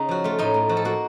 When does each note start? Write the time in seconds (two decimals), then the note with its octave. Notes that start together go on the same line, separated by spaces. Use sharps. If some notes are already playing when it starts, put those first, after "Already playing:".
Already playing: C#3 D#4
0.09 F3 F#4
0.24 A3 F4
0.39 A2 D#4
0.54 A2
0.69 F3 F#4
0.77 A4
0.85 A#3 F#4